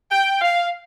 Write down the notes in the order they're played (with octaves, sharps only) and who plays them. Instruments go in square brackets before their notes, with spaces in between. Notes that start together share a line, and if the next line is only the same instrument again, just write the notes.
[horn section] G5
F5